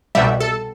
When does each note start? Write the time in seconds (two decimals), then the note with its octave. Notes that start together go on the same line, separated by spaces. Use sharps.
0.15 C2 B2 G3 E5
0.40 A4